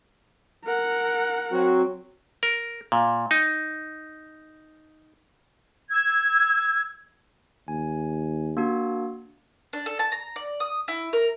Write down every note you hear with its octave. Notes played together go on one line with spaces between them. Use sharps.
A#4 F#5
F#3 C4 F#4
A#4
A#2
D#4
E6 G#6
D#2 G#5
A#3 D4 F#4
D4
A4
A5
A#5
D5
D#6
E4
A#4